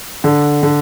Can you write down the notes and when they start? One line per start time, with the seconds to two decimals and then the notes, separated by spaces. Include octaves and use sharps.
0.24 D3
0.63 D3